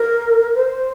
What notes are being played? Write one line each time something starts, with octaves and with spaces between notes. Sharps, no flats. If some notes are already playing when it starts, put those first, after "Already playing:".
Already playing: A#4
C5